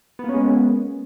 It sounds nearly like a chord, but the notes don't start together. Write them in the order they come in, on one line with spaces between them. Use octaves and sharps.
B3 A#3 C#4 G#3